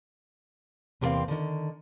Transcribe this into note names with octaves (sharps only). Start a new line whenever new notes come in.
E2 C3 G3 A#3 C4 F5
D3 D#3